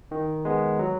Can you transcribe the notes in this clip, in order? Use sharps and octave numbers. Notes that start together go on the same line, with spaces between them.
D#3
G#3 B3
F#3